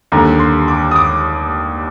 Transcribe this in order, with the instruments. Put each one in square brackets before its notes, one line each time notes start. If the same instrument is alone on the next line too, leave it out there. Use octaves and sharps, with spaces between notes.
[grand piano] D#2 D3 G3 A#5
C6
D6
D#6
D6